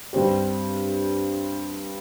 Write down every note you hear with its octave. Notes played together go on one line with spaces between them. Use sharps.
G2 G3 C4 G4